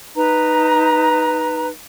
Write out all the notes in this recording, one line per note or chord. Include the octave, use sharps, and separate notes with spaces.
D#4 B4 A#5